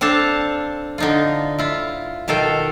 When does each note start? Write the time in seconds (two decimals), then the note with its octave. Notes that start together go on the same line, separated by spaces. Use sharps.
0.01 C4 D4 A4 F5 A5
0.98 D3 D#4 F4
1.59 E4 F4
2.28 B2 D#3 A4 F5 G5